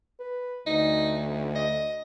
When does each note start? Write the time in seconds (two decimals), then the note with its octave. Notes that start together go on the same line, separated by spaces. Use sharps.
0.20 B4
0.67 D2 D#4
1.55 D#5